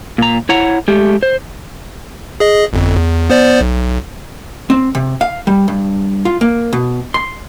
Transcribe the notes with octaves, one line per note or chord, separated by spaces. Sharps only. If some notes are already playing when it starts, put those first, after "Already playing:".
A#2 A#5
E4 C#5 F#5 A#5
G#3 A3 G4
C5
G#4 D#5
G1 F2
E2
B3 C5 D5
B1
C4
C3
F5
G3
G2
F4
A#3
B2
C6